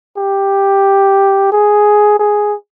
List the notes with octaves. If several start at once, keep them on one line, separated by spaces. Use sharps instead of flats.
G4
G#4
G#4